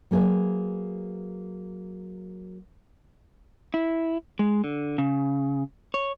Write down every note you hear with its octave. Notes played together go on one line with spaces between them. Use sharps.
F#3 A#3 G#4 B4 E5
E4
G#3
D3
C#3
C#5